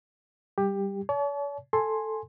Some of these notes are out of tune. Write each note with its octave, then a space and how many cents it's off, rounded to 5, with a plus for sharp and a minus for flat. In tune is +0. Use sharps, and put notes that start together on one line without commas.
G3 +0 G4 +15
C#5 +45 A5 -40
A4 +0 G#5 +0 C6 +10